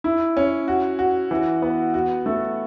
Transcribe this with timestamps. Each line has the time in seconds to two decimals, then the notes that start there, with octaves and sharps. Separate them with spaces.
0.04 E4
0.37 C#4
0.68 F#4
0.99 F#4
1.31 E3
1.62 B3
1.94 F#4
2.26 A3